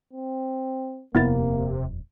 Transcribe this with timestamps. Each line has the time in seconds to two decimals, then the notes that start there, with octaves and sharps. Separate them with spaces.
0.13 C4
1.15 D#1 F2 C3 A#3 B3 E4 A6